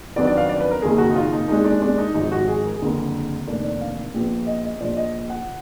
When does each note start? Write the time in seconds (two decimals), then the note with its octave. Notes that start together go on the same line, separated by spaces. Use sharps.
0.16 F2 D#3 F#3 B3 D4 D5
0.27 D5
0.37 F5
0.49 D5
0.60 B4
0.71 A#4
0.82 F#1 F2 D#3 A#3 G#4
0.98 F#4
1.11 D#4
1.16 F4
1.32 D#4
1.48 D#2 D#3 G#3 D4 D#4
1.64 D4
1.82 D4
1.98 D#4
2.14 G#1 G#2 F3 D#4
2.32 F#4
2.48 G#4
2.65 A#4
2.75 G#4
2.82 F#1 F2 D3 A#4
3.47 F1 F2 D#3 A#3 D4
3.64 D5
3.81 F5
4.14 A#1 A#2 F3 B3
4.47 D#5
4.64 D#5
4.81 A#1 A#2 F3 D5
4.97 D#5
5.30 F#5